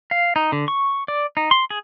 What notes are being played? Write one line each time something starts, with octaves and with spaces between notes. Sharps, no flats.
F5
D#4
D3
C#6
D5
D#4
C6
G#4